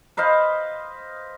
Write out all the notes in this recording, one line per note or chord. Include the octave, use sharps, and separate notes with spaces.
B4 C5 D#5 F5